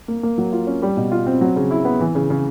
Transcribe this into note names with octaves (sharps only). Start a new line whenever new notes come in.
A#3
A#3
F#3
F4
C#4
G3
B2
F4
C4
F#3
C#3
E4
B3
E3
C#3
C#3